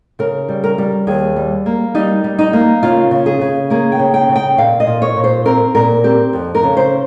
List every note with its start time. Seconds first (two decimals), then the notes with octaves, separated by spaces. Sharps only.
0.19 C#3 A#4
0.49 G3
0.64 A#4
0.78 G3
1.07 D#2 G#4
1.36 G3
1.66 A#3
1.95 G3 D#4
2.24 G3
2.39 D#4
2.53 A#3
2.83 C#3 F4
3.11 C#3
3.26 G#4
3.41 C#3
3.70 A#3 G#4
3.92 G5
3.99 C#3
4.14 G5
4.29 C#3
4.36 G5
4.58 A#2 F5
4.80 D#5
4.87 A#2
5.02 C#5
5.16 A#2
5.24 C5
5.45 C4 A#4
5.75 A#2 A#4
6.04 C4 G4
6.33 F2
6.55 A#4
6.63 C#3
6.77 C5